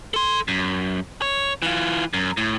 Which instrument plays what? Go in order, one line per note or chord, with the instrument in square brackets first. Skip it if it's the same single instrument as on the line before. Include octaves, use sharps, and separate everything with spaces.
[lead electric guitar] A4 C6
F#2
C#5
E3 F4
F#2
A2